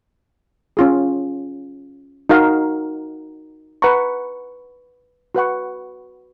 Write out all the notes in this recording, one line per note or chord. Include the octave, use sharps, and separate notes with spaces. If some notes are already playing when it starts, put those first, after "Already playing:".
C#4 F4 G#4
D#4 F#4 A#4 F5
B4 F#5 A#5 C#6
F#4 B4 F#5 C#6